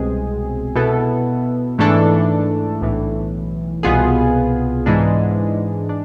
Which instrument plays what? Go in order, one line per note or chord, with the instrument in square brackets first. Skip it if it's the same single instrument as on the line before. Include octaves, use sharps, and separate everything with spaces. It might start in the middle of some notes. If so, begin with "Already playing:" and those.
Already playing: [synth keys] C2 B2 G#3 C4 G#4
B2 B3 E4 A4
G#2 E3 A3 D4 A4
B1 A2 E3
C2 B2 B3 F4 G#4
G#2 E3 G#3 D4
D4